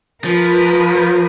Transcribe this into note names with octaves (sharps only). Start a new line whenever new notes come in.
F3 A#4 B4